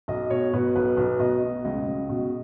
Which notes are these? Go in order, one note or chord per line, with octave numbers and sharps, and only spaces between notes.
B1 D#5
B2 C#5
B2 B4
B1 B4
B1
B2 D#5
B2
C#2 D#5
C#2
B2